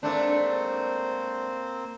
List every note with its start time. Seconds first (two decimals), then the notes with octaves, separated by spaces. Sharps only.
0.03 G#2 A3 A#3 C4 D4 C5